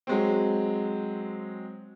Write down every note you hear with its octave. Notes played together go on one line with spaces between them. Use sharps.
F#3 G#3 C4